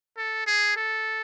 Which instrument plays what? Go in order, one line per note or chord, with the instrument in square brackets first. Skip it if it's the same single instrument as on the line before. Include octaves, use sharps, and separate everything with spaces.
[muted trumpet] A4
G#4
A4